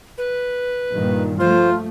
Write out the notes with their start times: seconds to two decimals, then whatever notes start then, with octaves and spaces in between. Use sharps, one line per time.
0.18 B4
0.91 G2 A#2 D#3
1.40 F3 A3 F4 C5